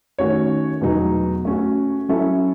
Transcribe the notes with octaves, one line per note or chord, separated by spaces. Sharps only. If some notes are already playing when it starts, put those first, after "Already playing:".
D#3 A3 C#4 F#4 C#5
E2 B2 F#3 A3 D#4
A3 C#4 F#4
F#3 C#4 E4 A4 E5